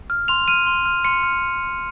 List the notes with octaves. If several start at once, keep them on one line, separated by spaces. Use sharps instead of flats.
F6
C6 F7
F6 D#7
C6
F6
C6 C#7
F6